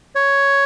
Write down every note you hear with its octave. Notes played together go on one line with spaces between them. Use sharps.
C#5